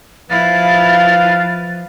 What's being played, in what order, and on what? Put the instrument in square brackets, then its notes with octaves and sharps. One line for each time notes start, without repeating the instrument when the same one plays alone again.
[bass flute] F3 [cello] E4 [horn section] B4 F5 [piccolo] A6